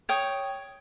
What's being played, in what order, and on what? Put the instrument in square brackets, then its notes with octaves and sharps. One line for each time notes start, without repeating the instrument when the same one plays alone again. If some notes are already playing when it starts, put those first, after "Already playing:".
[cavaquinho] C#5 G5 D#6